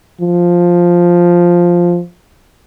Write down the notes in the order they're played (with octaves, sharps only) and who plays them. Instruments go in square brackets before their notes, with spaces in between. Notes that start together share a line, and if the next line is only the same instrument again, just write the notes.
[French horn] F3